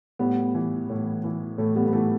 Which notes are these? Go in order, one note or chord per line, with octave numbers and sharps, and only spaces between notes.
A2 G3 B3
E3
A2
E3
A2 A3
G3 B3
B3
E3 A3